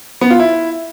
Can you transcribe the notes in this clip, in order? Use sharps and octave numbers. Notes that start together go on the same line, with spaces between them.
B3
F4
E4